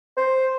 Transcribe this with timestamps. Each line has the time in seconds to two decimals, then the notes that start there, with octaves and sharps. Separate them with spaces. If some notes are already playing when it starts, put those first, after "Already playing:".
0.17 C5